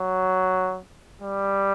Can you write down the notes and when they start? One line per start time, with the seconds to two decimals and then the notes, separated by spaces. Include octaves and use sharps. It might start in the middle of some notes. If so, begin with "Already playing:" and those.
Already playing: F#3
1.22 G3